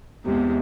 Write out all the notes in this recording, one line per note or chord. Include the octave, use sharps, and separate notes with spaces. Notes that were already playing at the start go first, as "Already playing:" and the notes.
E2 C3 E3 G#3